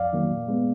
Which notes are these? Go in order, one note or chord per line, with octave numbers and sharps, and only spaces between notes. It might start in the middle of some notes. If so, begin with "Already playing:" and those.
Already playing: F2 D5 F5
D#3 F#3 A#3
A#2
G#3 B3